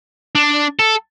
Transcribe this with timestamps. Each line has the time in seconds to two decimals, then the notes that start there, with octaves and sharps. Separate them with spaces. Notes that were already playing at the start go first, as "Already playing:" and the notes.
0.35 D4
0.79 A4